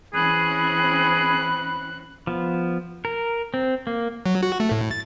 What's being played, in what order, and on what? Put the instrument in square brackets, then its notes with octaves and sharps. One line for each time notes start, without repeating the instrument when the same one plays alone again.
[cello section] E3 C4 C#4 [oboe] G#4 [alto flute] B5 [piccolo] F#6
[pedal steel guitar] F3 B3
A#4
C4
A#3
[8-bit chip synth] F#3
F#4
A3
A2
A6